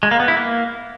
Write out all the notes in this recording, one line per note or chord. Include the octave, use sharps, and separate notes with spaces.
G#3
A#3
B3
E4
A#3